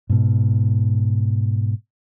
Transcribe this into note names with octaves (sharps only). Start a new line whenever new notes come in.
G#2 B2